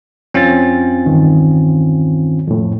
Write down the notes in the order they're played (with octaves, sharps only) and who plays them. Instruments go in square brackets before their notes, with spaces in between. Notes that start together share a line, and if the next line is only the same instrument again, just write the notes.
[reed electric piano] F2 A6 [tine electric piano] C4 C#4 F4
[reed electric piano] E2 G2 D#3
F2 A2